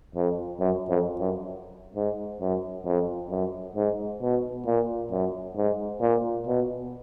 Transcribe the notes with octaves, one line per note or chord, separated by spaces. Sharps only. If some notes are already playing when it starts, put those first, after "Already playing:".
F2
F#2
F2
F#2
G#2
F#2
F2
F#2
G#2
B2
A#2
F#2
G#2
A#2
B2